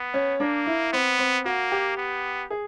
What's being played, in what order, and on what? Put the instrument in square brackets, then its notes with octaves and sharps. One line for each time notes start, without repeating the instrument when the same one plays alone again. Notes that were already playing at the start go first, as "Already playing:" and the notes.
Already playing: [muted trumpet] B3
[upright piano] C#4
[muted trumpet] A#3 [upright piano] D4
[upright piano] E4
[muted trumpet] B3 [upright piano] C4
[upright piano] C4
[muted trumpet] A#3 [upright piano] F#4
[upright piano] G4
[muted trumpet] B3
[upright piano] G#4